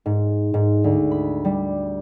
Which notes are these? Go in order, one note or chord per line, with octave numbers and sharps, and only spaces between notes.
G#2
G#2
D2
B5
G3